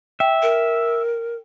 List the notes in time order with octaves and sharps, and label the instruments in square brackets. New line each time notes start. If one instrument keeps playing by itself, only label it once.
[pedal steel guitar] E5 [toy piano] G5
[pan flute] A#4